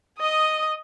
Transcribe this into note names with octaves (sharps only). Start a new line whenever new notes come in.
D#5 D#6